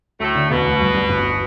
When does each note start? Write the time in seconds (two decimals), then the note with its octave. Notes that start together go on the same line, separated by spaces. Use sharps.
0.20 D2 A2 A3
0.35 D3
0.50 E1 B2 B3
0.65 D2
0.81 G2
0.94 G3
1.09 G1